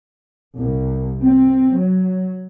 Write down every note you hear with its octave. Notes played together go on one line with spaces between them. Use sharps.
C2
C4
F#3